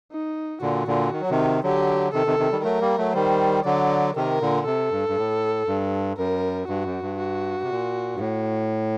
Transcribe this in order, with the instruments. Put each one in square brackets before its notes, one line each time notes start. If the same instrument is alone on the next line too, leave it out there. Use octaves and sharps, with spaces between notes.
[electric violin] D#4
[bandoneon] A#2 D3 [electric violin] F#4
[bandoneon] A#2 D3
D#3
F#3
C3 D#3
[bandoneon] D3 F#3 [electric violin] G4
[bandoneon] C3 D#3 [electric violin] A4
[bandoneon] C3 D#3
C3 D#3
D#3 G3
[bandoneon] F#3 A3 [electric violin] A#4
[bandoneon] G3 A#3
F#3 A3
[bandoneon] D#3 G3 [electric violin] C5
[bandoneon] D3 F#3 [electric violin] D5
[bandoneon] C3 D#3 [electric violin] A#4
[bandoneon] A#2 D3
[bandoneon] C3 [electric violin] A4
[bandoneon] G2
G2
A2
G2
[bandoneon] F#2 [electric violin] A#4
[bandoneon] G2 [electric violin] F#4
[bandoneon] F#2
G2
[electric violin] F#4
[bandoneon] C3
A#2
G2
A2